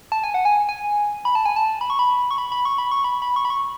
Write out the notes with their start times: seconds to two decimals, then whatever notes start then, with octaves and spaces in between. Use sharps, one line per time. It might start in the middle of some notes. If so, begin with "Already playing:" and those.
0.12 A5
0.24 G#5
0.34 F#5
0.45 G#5
0.69 G#5
1.25 B5
1.35 A5
1.45 G#5
1.56 A5
1.81 B5
1.90 C#6
1.99 B5
2.31 C#6
2.38 B5
2.52 B5
2.65 C#6
2.78 B5
2.92 C#6
3.04 B5
3.22 B5
3.36 C#6
3.45 B5
3.50 C#6